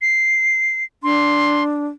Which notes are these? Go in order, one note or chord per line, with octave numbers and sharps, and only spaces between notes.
C7
D4 C6